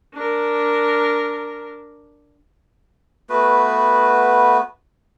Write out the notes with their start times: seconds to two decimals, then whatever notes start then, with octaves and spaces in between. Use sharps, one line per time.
0.14 D4 A#4
3.30 A3 B3 F#4 B4